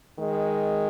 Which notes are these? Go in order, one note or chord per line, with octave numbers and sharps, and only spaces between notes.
D#3 G#3